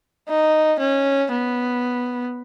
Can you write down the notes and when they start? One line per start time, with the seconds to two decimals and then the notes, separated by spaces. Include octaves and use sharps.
0.29 D#4
0.80 C#4
1.32 B3